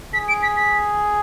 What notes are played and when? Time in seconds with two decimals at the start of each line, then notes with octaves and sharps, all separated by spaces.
0.14 G#4 B6
0.28 D7
0.43 B6
0.56 B6